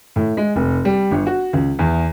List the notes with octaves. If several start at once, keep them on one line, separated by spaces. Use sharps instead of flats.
A2
G#3
F1
G3
G1
F#4
C#2
E2